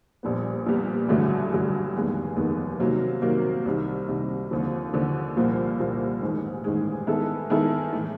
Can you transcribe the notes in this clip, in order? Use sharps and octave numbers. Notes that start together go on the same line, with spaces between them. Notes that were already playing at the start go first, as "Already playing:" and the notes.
A#1 A#2 G3 B3
A#1 A#2 G3 B3
A1 G2 D3 F#3 A3
A1 G2 D3 F#3 A3
F1 D#2 D#3 G#3 B3
F1 D#2 D#3 G#3 B3
C3 D#3 F#3 A#3
C3 D#3 F#3 A#3
C2 C3 D#3
C2 C3 D#3
D#2 D3 F3
D#2 D3 F3
C2 A#2 F3 A#3
C2 A#2 F3 A#3
A1 G#2 D#3 G#3
A1 G#2 D#3 G#3
D#3 G#3 B3 E4 A4
D#3 G#3 B3 E4 A4
A2 E3 A3